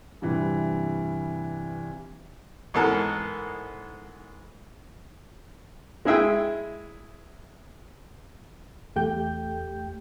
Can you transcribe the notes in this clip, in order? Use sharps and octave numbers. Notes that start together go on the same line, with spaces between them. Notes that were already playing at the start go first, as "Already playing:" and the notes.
G2 C3 E3
G#2 E3 B3 A4 A#4
G#3 E4 G#4 E5 G5
E2 A3 G4 G5 G6